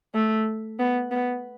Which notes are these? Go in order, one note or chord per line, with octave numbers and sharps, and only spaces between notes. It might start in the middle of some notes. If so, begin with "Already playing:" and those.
A3
B3
B3